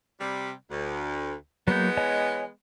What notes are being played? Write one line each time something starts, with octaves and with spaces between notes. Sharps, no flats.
C3 G3
D2
E3 F#3 G#3 A#3 B3 G6
C#5 D#5 G#5